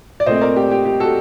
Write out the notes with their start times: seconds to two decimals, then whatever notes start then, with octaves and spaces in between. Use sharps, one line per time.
0.20 D5
0.26 A#2 A3 C4 C5 D#5
0.41 A#4 D5
0.56 G4
0.71 G4
0.85 G4
1.00 F#4 A4